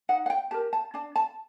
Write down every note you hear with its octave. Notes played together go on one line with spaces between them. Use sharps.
D#4 F#5
F#5
G5
G4 A#4 A5
A5
D4 A5
A5